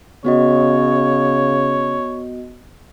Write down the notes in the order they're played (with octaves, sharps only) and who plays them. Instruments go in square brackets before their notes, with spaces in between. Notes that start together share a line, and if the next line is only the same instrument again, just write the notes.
[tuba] C#3 [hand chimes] B3 F#4 D#5 [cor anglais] C#5